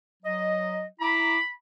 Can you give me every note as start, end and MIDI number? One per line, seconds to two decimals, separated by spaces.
0.23 0.85 54
0.23 0.85 75
1.00 1.38 64
1.00 1.38 82
1.00 1.50 83
1.00 1.38 86